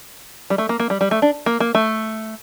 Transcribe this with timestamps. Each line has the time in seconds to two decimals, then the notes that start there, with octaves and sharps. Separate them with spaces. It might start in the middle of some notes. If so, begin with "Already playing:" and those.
0.50 G3
0.58 A3
0.69 A#3
0.80 A#3
0.90 G3
1.01 G3
1.11 A3
1.22 D4
1.46 A#3
1.60 A#3
1.75 A3